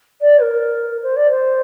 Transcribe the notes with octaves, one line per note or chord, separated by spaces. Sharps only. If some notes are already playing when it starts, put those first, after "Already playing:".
D5
A#4
C5
D5
C5